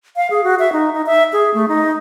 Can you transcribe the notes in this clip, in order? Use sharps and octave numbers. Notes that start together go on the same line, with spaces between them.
F5
G#4
F#4
E5
D#4
D#4
E5
G#4
A3
D#4